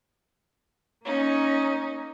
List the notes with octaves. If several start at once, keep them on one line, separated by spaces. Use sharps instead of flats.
A#3 C#4 D#4